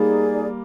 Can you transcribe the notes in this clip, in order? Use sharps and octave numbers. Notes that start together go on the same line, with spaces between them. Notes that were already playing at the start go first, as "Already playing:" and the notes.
Already playing: G3 A#3 D#4 G#4 D5